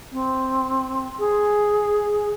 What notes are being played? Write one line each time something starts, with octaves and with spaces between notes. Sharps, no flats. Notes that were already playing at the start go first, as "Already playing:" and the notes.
C4
G#4